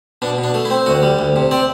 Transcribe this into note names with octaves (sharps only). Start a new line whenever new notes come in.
B2 D4
B2
D4
A3
E4
C4
D2 F#4
G3
D2
C3
C4 D5